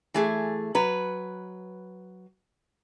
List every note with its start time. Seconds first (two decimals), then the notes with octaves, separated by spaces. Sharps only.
0.14 E3 A3 G#4
0.75 F#3 B4